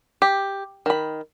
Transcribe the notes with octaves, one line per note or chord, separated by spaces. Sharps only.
G4
D#3 B5